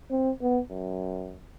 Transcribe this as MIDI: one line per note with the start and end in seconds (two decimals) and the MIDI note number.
0.11 0.31 60
0.41 0.59 59
0.70 1.37 42